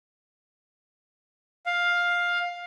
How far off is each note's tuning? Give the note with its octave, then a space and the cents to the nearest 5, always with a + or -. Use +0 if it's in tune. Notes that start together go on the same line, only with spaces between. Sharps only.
F5 +10